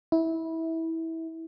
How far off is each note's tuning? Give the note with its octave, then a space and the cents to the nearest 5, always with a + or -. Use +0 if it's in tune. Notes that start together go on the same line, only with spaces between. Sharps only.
E4 -20